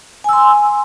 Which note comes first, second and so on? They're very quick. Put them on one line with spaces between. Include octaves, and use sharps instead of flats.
G#5 E6 C6